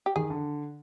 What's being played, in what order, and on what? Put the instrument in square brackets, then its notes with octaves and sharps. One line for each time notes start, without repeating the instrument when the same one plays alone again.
[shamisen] G4
[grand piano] D#3 [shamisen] G#4
[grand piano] D3